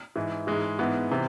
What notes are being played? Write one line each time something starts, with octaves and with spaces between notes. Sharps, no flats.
G#2 E3
G#2 E3 G#3
G#2 E3 B3
C3 E3